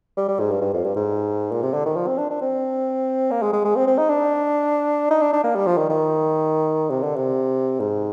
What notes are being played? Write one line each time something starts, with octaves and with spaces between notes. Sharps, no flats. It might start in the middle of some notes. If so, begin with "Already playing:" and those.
G3
G3
G#2
G2
G2
F2
G2
G#2
A#2
C3
D3
D#3
F3
C4
D4
D4
C4
A#3
G#3
G#3
G#3
C4
C4
D#4
D4
D#4
D4
D4
A#3
G3
F3
D#3
D#3
C3
D3
C3
G#2